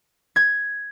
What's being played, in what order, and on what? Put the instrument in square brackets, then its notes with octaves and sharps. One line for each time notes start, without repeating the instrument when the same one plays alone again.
[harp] G#6